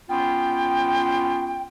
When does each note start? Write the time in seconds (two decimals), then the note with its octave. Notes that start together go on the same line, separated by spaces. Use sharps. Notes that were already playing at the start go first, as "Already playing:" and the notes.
0.09 B3 C#4 F4 G5